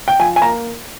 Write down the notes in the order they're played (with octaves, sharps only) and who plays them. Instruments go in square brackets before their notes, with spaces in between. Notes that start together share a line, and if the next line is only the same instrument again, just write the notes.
[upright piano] G5
F3 G#5
G#5
A#3 A#5